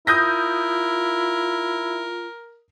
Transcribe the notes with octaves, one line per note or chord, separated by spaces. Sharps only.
E4 F4 A#4 D#6 G6 A#6